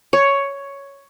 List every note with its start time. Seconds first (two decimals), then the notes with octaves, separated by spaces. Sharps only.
0.13 C#5